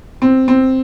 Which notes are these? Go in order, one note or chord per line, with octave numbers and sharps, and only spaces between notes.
C4
C4